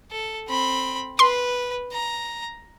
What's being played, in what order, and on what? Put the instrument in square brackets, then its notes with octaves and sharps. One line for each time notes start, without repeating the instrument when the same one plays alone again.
[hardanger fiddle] A4
C4 B5
[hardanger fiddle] B4 [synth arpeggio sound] C6
[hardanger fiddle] A#5